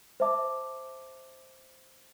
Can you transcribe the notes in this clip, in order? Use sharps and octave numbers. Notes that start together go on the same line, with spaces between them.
C5 E5 A5 D6